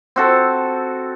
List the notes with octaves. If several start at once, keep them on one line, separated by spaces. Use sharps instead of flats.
C4 F#4 A4